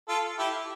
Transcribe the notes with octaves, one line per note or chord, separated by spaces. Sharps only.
F4 A4
E4 G4